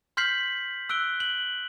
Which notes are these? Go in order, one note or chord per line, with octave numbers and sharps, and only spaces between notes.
C6 F6 G6 B6 C7 F#7
E6 F#6 D7 G7
F#7